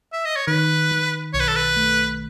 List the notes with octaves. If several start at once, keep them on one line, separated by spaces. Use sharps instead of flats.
E5
D#5
C#5
D#3 B4
D#3
B1 C#5
B4
A4
B4
A3